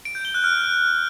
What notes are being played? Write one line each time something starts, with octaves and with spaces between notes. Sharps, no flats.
D7
G6
G7
F#6
F6